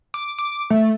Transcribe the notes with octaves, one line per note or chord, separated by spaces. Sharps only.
D6
D6
A3